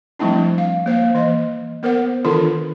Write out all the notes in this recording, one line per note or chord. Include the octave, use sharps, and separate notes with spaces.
F3 G3 A3 C4 D4 E4
F5
A#3 C5 F5
E3 D#5
B3 A#4 C5 F#5
D#3 E3 D4 F4 A4 A#4